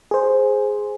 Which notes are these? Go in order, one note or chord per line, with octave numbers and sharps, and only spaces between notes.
G#4 C5